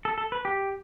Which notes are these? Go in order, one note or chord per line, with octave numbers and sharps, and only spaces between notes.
A4
A4
B4
G4